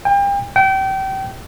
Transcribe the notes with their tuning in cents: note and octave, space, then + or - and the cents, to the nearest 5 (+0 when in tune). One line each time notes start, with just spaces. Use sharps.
G5 +35
G5 -30